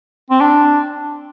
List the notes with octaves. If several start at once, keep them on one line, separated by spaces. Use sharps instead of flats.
C4
D4